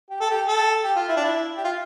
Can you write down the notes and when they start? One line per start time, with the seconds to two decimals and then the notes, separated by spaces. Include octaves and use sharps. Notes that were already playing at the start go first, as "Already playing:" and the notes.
0.10 G4
0.21 A4
0.31 G4
0.48 A4
0.84 G4
0.96 F4
1.08 E4
1.17 D4
1.24 E4
1.58 G4
1.64 F4